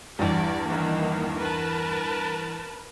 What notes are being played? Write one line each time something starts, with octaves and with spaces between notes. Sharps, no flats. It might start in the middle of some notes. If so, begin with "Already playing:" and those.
E2 G2 G4 D5
D#3 E3 A#3
A#4 B4 A5